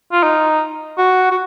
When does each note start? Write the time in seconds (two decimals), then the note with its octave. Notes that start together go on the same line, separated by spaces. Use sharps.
0.12 F4
0.23 D#4
0.98 F#4
1.31 F#4